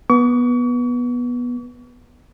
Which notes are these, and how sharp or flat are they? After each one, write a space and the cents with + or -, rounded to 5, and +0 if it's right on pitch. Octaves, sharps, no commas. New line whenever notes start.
B3 -15 C#6 +40